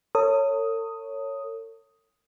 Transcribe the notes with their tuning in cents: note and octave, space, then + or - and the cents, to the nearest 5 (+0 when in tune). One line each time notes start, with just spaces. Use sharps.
A4 +45 C#5 +0 D#6 +5